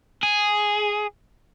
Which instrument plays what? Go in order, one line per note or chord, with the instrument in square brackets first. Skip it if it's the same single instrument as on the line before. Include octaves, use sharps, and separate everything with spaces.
[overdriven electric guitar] G#4